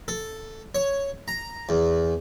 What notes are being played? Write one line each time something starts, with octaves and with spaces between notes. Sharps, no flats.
A4
C#5
A#5
E2